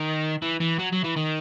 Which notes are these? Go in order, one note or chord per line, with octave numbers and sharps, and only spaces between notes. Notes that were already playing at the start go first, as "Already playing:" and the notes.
Already playing: D#3
E3
E3
F#3
F#3
E3
D#3